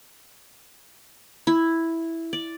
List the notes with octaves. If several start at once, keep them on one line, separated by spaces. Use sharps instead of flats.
E4
D5